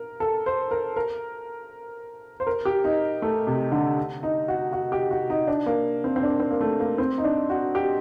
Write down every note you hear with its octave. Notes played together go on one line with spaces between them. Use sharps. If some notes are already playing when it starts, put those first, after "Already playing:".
Already playing: A#4
A4
C5
A#4
A#4
C5
A#4
G4
D#4
A3
C3
D3
D#4
F#4
F#4
G4
F#4
D#4
D4
A#3
C4
C4
D4
C4
A#3
A3
A#3
C4
D#4
D4
F#4
G4